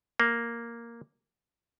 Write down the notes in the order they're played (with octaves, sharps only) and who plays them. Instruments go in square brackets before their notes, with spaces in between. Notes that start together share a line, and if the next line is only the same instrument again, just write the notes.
[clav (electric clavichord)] A#3